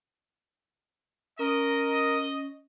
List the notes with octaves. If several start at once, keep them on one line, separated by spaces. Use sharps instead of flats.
C#4 A#4 D#5